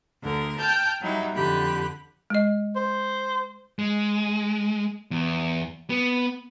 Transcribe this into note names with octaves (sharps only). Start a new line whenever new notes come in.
D2 D3 A#4
G5 A5 F6 G6
F#3 G3 D#4 E4
F2 D3 G4 B5 F#6
G#3 D#5
C5
G#3
E2
B3